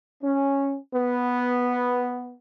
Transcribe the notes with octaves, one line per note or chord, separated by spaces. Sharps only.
C#4
B3